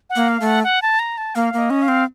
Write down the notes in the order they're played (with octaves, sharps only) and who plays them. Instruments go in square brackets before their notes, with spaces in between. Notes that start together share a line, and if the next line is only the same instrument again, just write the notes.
[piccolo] F#5
[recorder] A#3
[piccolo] F5
[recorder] A3 [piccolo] F#5
[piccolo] F#5
A5
A#5
A5
[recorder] A#3 [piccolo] F5
[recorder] A#3 [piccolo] D#5
[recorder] C#4
[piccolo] F5
[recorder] C4